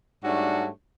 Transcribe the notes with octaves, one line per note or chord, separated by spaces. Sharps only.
G#2 G3 A3 D4 F#4 C#5